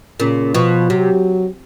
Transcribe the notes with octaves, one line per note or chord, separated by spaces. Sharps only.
A#2 C#3
B2 F3
C3 F#3